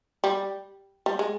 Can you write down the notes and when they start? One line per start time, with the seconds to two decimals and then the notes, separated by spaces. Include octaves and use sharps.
0.24 G3
1.06 G3
1.19 G#3